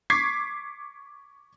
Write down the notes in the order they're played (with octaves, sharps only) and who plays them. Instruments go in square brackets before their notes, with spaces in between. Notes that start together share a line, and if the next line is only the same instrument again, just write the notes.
[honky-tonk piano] C#6 D6 G#6 B6 C7